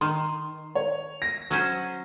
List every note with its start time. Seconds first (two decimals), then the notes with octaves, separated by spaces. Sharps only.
0.01 D#3 C6
0.75 C#5
1.22 A#6
1.50 F#3 C#4 C5